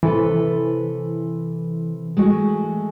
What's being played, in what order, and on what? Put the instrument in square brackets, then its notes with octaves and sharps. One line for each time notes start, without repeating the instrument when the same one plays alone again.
[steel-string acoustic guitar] C3 A4 B4 [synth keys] E3
[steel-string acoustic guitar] G#3 A3 F#4